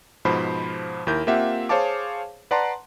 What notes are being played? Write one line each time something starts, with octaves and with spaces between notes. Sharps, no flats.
G#2 B2 F3 C5 B5
D#2 E4 A#4 G6
A#3 C4 F4 G4 E5 F#5
G#4 C5 C#5 F5 A5 D6
B4 D5 F#5 A5 A#5 C6